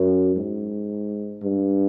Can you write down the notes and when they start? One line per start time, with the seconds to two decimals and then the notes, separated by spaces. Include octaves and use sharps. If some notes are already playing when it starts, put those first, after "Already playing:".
Already playing: F#2
0.36 G#2
1.42 G2